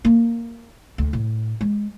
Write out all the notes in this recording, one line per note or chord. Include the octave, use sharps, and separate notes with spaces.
A#3
D2
A2
G#3